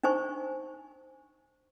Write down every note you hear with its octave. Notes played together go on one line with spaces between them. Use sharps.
D4 D#4 C5 G#5 C#6